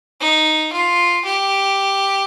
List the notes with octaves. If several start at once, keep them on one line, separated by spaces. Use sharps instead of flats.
D#4
F4
G4